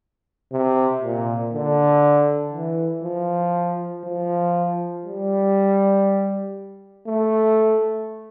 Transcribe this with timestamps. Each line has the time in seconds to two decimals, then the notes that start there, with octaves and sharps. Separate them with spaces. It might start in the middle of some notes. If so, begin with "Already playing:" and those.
0.52 C3
1.02 A#2
1.54 D3
2.53 E3
3.04 F3
4.05 F3
5.05 G3
7.07 A3